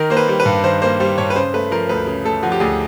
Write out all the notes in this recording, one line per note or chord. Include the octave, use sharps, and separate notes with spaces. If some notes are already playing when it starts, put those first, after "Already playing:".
Already playing: D#3 A#4
A#3 C5
B4
G3
B4
G2
D#3 C5
A#3 C5
G3 C5
G2 C#5
B4
C#3 C5
A3 B4
F3 A#4
D2 B4
C#3
A3 A4
F3 F#4
G4
D2 G#4